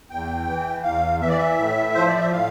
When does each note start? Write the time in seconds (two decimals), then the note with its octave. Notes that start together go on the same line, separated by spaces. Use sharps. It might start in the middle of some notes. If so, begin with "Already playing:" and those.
0.10 E2 G5
0.47 E3
0.83 E2 F5
1.21 E3 E5
1.29 D5
1.38 E5
1.58 A2
1.94 F3 C5
2.07 D5
2.19 E5
2.31 A2 F5